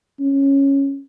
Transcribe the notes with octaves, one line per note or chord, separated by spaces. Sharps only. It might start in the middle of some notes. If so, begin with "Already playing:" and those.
C#4